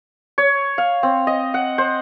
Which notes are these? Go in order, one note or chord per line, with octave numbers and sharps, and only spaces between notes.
C#5
F5
C4
D#5
F#5
C5